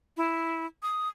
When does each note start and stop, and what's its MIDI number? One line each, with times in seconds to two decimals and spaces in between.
0.17 0.66 64
0.83 1.09 87